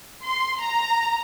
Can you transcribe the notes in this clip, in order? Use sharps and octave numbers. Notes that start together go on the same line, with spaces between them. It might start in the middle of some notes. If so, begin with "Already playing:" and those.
C6
A#5